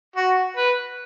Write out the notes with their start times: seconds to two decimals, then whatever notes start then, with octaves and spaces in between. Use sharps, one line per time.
0.16 F#4
0.57 B4